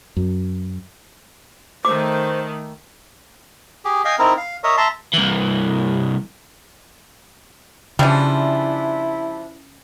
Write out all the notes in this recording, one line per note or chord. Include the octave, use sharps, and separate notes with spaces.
F#2
D#3 A3 C5 D6
G4 G#4
D#5 F5 G5 G#5
C4 D#4 E4 A#4
F5
A#4 C#5 D#5 E5
E5 A5 A#5 C6
C2 E3
C#3 E3 F3 G3 D4 E4